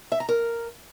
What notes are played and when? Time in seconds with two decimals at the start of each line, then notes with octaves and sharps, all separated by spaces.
0.12 E5
0.20 A#5
0.29 A#4